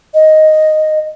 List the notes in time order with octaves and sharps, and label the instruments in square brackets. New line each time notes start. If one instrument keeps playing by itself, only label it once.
[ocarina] D#5